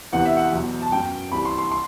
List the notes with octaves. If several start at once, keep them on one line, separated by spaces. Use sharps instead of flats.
E2 C3 E3 F#5
E5
F#5
E2 B2 F#3
A5
F#2 F#3 G5
C2 C3 E3 B5
C6
C6
C6